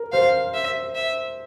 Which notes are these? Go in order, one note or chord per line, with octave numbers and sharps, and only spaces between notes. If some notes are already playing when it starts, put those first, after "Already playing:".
Already playing: A#4
C5 F5
E5
E5